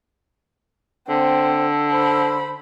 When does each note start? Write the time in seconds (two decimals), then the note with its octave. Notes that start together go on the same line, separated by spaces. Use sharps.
1.09 D3 C4
1.91 C5 B5